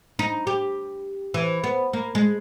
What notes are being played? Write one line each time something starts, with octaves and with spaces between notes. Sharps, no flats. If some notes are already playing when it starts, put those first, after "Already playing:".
D#4
G4
E3
B3
A#3
G#3